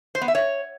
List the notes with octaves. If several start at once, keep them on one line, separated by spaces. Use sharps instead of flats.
C5
B3
E5
C#5